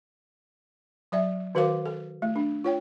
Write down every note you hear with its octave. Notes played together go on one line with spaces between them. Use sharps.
F#3 D5 E5
D#3 F#4 A#4 C5 F5 D6
A4
A3
D4
F4 C#5 G5